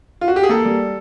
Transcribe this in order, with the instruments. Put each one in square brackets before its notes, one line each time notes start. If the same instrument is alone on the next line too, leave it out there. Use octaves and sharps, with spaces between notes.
[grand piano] F4
F#4
G4
G#4
A#3 A4
G3